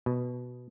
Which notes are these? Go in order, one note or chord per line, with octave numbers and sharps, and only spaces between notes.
B2